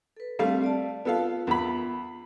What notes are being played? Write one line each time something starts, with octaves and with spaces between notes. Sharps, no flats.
A4 B4
G3 A3 C4 F5
D5 A5
B3 F4 A4 F5
E2 B5